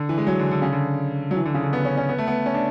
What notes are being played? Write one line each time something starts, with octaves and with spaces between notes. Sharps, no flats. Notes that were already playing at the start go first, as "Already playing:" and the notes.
Already playing: D3
E3
G#3
F#3
D3
D3
C#3
D3
F#3
E3
D3
C#3
D3
B3
C#4
C#4
B3
A3
B3
C#4
D4